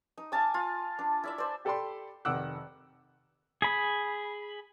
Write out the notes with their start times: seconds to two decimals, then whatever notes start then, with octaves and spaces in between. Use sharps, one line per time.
0.18 D#4
0.32 F5 G#5 A5 D6
0.54 F4
0.99 D4
1.24 E4 D5 E5
1.38 C5 D5
1.65 G4 A4 D5 G5 B5 C6
2.25 F1 D#3 F#5 D6 E6 F#6
3.62 G#4 B5